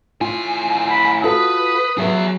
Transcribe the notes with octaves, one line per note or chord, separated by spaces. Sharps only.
A2 F4 G#5
B5
F4 F#4 A4 B4 D#6
F#3 G#4 B4 E5